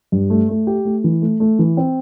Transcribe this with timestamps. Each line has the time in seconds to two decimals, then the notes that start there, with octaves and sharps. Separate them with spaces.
0.12 G2
0.30 A3
0.49 A3
0.67 G4
0.85 A3
1.04 E3
1.22 A3
1.40 A3
1.59 E3
1.77 C4